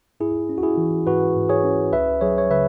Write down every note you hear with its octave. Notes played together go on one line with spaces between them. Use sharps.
G#2 E4 G#4
C#4
F#4
E4 G#4
E3
G#2 F#4 B4
G#2
G#4 C#5
C#4
C#2 B4 E5
F#3 G#4 C#5
C#5
C#3 B4 E5